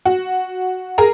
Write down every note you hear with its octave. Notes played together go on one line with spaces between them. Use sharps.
F#4
G#4 A#4 A#5